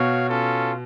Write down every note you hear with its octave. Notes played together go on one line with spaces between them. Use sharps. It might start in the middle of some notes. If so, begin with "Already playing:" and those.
Already playing: B2 F#4 C#5 F5
C#4 F4 A4